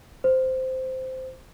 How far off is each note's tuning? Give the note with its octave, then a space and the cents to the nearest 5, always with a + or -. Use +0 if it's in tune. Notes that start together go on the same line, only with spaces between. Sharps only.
C5 -10